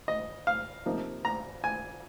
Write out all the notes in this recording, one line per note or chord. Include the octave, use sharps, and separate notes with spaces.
D#5
F5
C3 F3 A#3 D#4
A#5
G#5